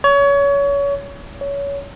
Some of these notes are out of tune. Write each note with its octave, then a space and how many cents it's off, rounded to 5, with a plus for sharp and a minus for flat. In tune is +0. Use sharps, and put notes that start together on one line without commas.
C#5 +25
C#5 +20